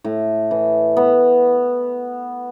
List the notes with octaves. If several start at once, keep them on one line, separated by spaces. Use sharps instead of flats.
A2
E3
B3